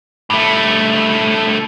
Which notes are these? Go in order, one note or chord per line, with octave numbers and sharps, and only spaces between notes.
G2 A3